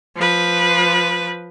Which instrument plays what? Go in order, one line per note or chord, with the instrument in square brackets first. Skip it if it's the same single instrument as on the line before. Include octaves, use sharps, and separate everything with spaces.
[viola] F3 B4